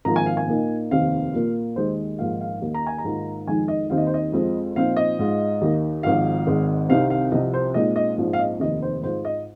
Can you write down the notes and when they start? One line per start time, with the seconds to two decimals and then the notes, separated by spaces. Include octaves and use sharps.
0.05 G#1 G#2 F3 A#3 F4 A#5
0.16 G#5
0.26 F5
0.37 G#5
0.48 A#2 A#3 D#4
0.91 F1 D#2 D#3 C4 F5
1.33 A#2 A#3 F4
1.76 D#2 D#3 G#3 C5
2.18 A#1 G#2 D#3 A#3 F4 F5
2.41 F5
2.62 D#2 D#3 A#3 D#4
2.74 A#5
2.87 G#5
2.98 A#5
3.04 G#2 D#3 A#3 F4
3.47 F2 D#3 G#3 D#4 G#5
3.68 D#5
3.90 D#2 D#3 C4 D#4 F5
3.98 D#5
4.07 C5
4.14 D#5
4.32 F2 F3 G#3 C4
4.76 A#2 F3 C4 D#4 F5
4.97 D#5
5.19 G#2 G#3 F4
5.61 D#2 D#3 A#3
6.03 G#1 G#2 F3 F5
6.47 G#1 G#2 G#3
6.89 C2 C3 D#3 C4 F5
7.10 F5
7.32 C2 C3 F3 D#5
7.54 C5
7.74 A#2 G#3 C4 D#4 D#5
7.96 D#5
8.18 A#1 G#2 F3 C4
8.33 F5
8.39 D#5
8.60 F1 D#2 D#3 D#5
8.82 C5
9.03 G#2 G#3 F4 C5
9.25 D#5